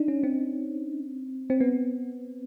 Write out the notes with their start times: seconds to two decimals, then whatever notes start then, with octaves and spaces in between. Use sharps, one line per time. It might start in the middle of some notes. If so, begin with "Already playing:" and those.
Already playing: D4 D#4
0.08 C#4
0.23 C4
1.50 C4
1.60 B3